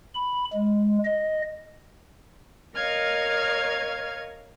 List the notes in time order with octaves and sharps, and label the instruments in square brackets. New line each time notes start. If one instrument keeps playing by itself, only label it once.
[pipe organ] B5
G#3
D#5
[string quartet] A#4 C#5 D#5 F5 F6 G#6